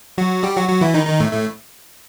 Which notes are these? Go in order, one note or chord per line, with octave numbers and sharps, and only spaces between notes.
F#3 F#4
G3 G4
F#3 F#4
F#3 F#4
E3 E4
D#3 D#4
D#3 D#4
A2 A3
A2 A3